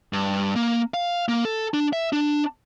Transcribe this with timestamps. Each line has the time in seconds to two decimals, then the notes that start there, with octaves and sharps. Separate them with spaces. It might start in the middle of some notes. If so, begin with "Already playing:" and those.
0.13 G2
0.56 A#3
0.94 F5
1.28 A#3
1.45 A4
1.74 D4
1.93 E5
2.13 D4